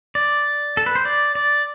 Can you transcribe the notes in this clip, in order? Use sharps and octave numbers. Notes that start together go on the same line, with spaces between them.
D5
A4
B4
C5
D5
D5